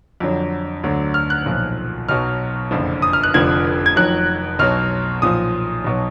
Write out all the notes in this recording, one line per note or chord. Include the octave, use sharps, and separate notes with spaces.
F2 D3 F#3
D2 D3 F#3
F6
F#6
B1 A#2 F3
B1 B2 F#3 F6
F#1 F2 D3 F3
D#6
F6
F#6
F1 F2 D3 F3 G#6
G#6
F2 D#3 F#3 F#6
B1 B2 F#3 F6
B1 A#2 F3 D#6
B1 B2 F#3